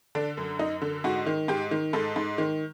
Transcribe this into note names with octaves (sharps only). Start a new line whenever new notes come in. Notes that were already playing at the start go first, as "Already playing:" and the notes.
D3 D4
F#2
F#2 D#4
D3
G#2 F#4
D#3
G#2 G4
D#3
G#2 A4
G#2
D#3